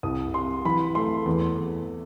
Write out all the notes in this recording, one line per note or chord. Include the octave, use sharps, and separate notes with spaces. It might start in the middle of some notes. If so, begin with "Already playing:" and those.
C2 D#6
C3 C6
E3 B5
A3 C6
E2
E2